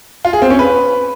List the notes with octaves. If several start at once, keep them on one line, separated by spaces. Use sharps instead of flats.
F4
G#4
C4
C#4
B4